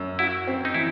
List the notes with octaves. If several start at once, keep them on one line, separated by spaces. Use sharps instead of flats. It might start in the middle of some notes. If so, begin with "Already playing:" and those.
Already playing: F#2
E4 F#4
C4
D#4
E3 E4